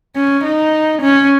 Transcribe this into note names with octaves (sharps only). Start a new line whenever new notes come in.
C#4
D#4
C#4